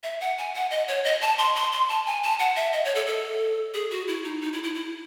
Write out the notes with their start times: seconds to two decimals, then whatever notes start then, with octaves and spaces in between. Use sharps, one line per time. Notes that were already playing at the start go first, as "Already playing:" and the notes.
0.03 E5
0.21 F#5
0.38 G#5
0.55 F#5
0.71 D#5
0.88 C#5
1.05 D#5
1.21 A5
1.38 C6
1.56 C6
1.72 C6
1.89 A5
2.06 G#5
2.23 A5
2.39 F#5
2.56 E5
2.73 D#5
2.85 C#5
2.95 A4
3.07 A4
3.74 G#4
3.91 F#4
4.08 E4
4.24 D#4
4.41 D#4
4.53 E4
4.64 E4
4.75 E4